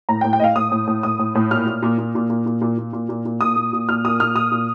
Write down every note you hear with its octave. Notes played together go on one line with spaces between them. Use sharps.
A2 A#5
G5
A2
G5
A2 D#5 F5
A2 D#6
A2
A2
A2 D#6
A2
A2
A#2 F6
A#2
A#2
A#2
A#2
A#2
A#2
A#2
A#2
A#2
A#2
A#2
A#2 D#6
A#2
A#2
A#2 F6
A#2 D#6
A#2 F6
A#2 D#6
A#2